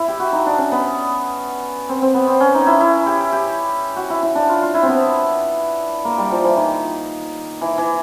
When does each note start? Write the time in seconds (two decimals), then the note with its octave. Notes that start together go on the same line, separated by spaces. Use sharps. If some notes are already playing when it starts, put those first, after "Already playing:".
Already playing: E4
0.08 G4
0.20 F#4
0.33 D#4
0.46 D4
0.58 C#4
0.72 B3
1.89 C4
2.02 C4
2.14 B3
2.27 C4
2.40 C#4
2.54 D#4
2.67 E4
2.80 E4
3.06 G4
3.32 G4
3.96 F#4
4.10 E4
4.23 E4
4.35 D4
4.49 F4
4.62 F4
4.74 E4
4.83 C4
4.88 B3
6.05 A#3
6.18 G3
6.31 F3
6.44 E3
6.57 D#3
7.61 E3
7.78 E3